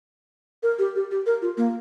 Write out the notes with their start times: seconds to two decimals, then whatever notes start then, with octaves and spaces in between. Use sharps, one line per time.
0.63 A#4
0.79 G4
0.95 G4
1.11 G4
1.26 A#4
1.42 F4
1.57 A#3